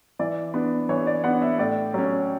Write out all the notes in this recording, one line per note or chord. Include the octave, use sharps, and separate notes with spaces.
E3 D5
B3 D4
E3 C#5
D5
B3 D4 F#5
E5
A2 D5
F#3 C#4